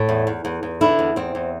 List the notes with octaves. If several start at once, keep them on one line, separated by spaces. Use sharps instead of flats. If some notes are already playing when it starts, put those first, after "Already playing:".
Already playing: A2
E2
E2
E2
E2
D3 E4
E2
E2 C4
E2